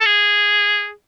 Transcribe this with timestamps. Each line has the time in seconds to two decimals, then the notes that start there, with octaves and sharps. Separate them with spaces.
0.01 A4
0.05 G#4